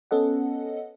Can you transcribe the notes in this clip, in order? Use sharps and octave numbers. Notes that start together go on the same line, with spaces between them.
B3 C#4 A4 D#5 F#5